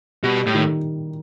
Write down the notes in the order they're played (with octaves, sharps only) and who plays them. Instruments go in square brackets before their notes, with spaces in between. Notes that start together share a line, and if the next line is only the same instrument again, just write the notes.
[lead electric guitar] B2 [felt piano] G3
[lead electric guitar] A2
[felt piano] D#3